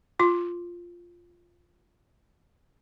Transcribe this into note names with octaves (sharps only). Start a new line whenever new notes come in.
F4 D6